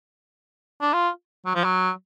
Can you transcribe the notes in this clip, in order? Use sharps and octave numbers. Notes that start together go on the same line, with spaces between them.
D4
F4
F#3
F3
F#3